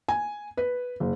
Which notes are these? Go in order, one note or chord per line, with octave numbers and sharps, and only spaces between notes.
G#5
B4
F#1